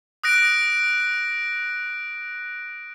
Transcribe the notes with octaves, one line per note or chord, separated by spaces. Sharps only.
D#6 F#6 A#6 D7